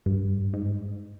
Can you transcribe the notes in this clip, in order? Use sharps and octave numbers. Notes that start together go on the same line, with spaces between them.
G2
G#2